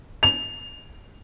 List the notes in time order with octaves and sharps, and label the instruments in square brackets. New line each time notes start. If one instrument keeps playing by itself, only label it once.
[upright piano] F7